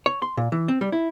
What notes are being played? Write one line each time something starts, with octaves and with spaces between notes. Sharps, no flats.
C#5
C6
A#2
E3
C4
G3
E4